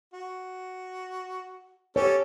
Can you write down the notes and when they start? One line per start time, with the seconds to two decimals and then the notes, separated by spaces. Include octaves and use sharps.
0.14 F#4
1.96 C#4 G4 A4 C#5